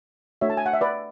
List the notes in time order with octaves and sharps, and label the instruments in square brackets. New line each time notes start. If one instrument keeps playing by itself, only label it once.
[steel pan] A3 D4 F#4 C#5 E5
A5
G#5
F#5
E5
B4 D5